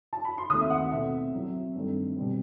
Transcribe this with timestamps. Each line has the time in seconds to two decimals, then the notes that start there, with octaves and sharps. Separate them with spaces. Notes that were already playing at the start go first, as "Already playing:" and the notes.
0.13 A5
0.25 B5
0.38 C6
0.50 D#2 D#3 A3 C4 D#6
0.61 E5
0.70 F#5
0.92 B2 A3 C4 E5
1.33 A2 F#3 C4
1.75 G2 D#3 A3 C4
2.16 B2 G3 C4